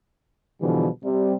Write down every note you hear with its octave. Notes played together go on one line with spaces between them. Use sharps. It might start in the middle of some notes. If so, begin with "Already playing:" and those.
B2 D3 E3 F3 G3
C3 G3